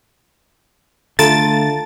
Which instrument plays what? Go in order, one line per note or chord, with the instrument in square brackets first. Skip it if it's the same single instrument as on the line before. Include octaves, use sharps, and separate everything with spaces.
[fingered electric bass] D3 [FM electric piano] A3 F4 [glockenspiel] A5 A#5 D7 [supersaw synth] A6